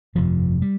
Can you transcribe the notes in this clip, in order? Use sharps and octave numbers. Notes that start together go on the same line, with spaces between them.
G1 F2 C3 F3
G3